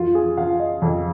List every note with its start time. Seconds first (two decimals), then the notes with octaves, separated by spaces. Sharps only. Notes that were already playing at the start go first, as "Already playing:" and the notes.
Already playing: F2 F4
0.15 G#4
0.37 F3 F5
0.59 D#5
0.82 F2